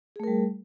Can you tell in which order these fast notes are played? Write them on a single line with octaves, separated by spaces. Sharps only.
G#4 A3 A#4 G3